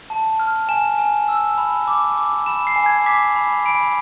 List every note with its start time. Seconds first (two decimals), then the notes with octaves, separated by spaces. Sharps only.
0.10 A5
0.40 F6
0.69 G#5 E7
0.98 G#5
1.28 E6
1.58 B5
1.88 D6
2.18 D6
2.46 B5 E7
2.67 C7
2.76 G#5
2.86 G#6
3.06 D6 B6
3.36 B5
3.66 B5 D7